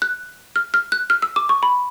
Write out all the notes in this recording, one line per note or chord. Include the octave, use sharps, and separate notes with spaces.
F#6
F6
F6
F#6
F6
E6
D6
C#6
B5